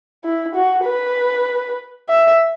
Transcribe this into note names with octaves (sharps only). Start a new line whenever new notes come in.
E4
F#4
B4
E5